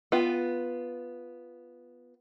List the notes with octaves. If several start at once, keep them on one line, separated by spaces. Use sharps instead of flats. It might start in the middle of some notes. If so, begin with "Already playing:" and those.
B3 F4